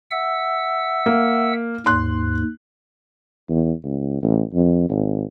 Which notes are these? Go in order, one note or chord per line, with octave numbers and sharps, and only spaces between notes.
E5 F#5 E6
A#3
D#2 G#2 C6 F#6
E2
C#2
A1
F2
G#1